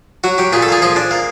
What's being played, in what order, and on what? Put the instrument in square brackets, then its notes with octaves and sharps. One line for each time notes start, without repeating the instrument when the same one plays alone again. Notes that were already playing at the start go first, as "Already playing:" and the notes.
[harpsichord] F#3 F#4
F#3 G4
A#2 G#4
A4
A#3 G#4
F3 G#4
D4
A#3